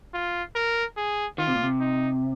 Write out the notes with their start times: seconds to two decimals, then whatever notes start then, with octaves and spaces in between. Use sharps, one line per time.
0.14 F4
0.56 A#4
0.97 G#4
1.38 D#3 F4
1.47 C3
1.55 A#2
1.63 C3
1.80 D#4